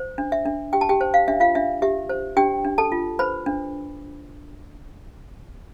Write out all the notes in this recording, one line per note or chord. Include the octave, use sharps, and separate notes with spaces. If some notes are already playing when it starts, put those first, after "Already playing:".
Already playing: C5
D4
E5
D4
G4 G5
A5
G4 G5
C5
F5
D4 E5
F4 F5
D4 E5
G4 E5
C5
D4 G4 G5
D4
A4 A5
F4
B4 C5 B5
D4